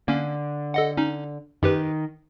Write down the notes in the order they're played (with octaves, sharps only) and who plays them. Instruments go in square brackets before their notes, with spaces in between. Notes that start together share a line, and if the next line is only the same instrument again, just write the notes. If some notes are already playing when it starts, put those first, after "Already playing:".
[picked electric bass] D3 [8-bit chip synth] A#3 C#4
[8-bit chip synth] A4 D#5 F#5
C#4 D#4
[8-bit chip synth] F#2 G4 B4 [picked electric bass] D#3